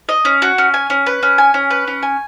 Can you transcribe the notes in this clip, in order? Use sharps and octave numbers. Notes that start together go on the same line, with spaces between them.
D#5
C#4
F#4
C#4
G#5
C#4
B4
C#4
G#5
C#4
B4
C#4
G#5